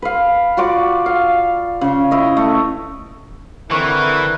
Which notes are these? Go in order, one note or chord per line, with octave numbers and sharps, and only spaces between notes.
B4 F5
F4 F#4 D5 D6
F5
C#3
E4 C#5 D#5
A3
D3 E3 C4 E4 A#4 B4 C#6